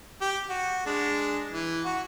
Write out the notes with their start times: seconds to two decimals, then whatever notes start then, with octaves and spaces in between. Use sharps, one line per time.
0.21 G4
0.50 F#4
0.86 G#3 D4
1.50 E3
1.85 F#4